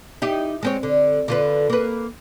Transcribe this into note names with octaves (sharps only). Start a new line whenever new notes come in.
D#4 E4 G4
G#3 C4 C#5
D3
D3 F4 B4
A#3 B4